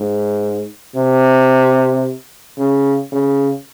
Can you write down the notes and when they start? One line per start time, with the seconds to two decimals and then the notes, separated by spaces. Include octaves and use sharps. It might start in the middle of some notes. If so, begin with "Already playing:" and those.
Already playing: G#2
0.95 C3
2.58 C#3
3.12 C#3